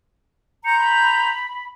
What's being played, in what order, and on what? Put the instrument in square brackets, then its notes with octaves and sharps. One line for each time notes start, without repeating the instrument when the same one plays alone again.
[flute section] A#5 C6 G6 [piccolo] C#7
[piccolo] B5